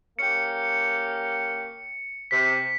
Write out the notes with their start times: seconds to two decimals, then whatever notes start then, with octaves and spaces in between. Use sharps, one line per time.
0.19 A#3 C#4 G4 C#7
2.31 C3 B6